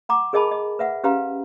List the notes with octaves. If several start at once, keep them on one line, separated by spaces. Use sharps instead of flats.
F#5 A#5 D6
G#4 A#4 D#5 G#5 A5 B5
D#5
B4 E5 F#5
C#4 G4 B4 F5 A#5